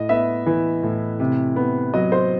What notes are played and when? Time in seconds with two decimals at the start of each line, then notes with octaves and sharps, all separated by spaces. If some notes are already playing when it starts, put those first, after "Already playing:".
Already playing: A2 D#5
0.09 B3 E5
0.46 E3
0.83 A2
1.20 C3
1.56 B3
1.94 F#3 D#5
2.12 C5